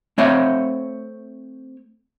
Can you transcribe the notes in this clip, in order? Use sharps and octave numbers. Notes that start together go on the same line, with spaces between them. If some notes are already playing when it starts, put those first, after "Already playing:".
A3 C4 C#5 E5